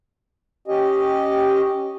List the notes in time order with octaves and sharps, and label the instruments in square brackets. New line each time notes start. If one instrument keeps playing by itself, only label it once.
[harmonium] C#4 G4 D#5